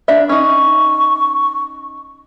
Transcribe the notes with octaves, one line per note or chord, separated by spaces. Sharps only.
D4 D5 E5
C#4 D#4 C#6